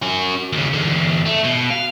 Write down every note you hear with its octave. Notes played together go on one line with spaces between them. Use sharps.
C#4 F#4
D#2 C#3
E2 D3
A3
B2
F5